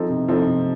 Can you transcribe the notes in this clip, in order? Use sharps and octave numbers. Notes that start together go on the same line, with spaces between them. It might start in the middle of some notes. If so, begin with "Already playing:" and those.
Already playing: F3 C4 D#4 A4
C3
F3 C4 D#4 A4
C3